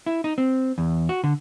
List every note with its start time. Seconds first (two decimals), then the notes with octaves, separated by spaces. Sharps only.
0.06 E4
0.24 D#4
0.38 C4
0.78 E2
1.09 F#4
1.24 D3